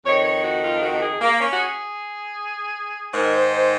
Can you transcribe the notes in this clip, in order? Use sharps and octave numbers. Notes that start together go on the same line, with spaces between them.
F2 D#3 C#5
C#5
F#4
F4
F#4
G#4
A#3
C#4
F#4
G#4
G#2 D#3 A#4
C5
C5